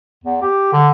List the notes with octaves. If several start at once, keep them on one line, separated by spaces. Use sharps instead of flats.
E2
G4
D3